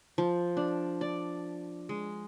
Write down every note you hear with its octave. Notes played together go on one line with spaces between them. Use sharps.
F3
D4
D5
G#3